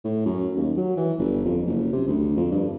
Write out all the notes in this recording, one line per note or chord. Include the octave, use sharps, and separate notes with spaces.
A2
F#2
D#2
F#3
E3
G1
F2
F#1
C3
D2
F2
G2